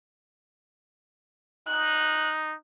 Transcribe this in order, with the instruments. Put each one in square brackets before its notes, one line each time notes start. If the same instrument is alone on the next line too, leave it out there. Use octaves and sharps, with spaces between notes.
[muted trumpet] D#4 [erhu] F#6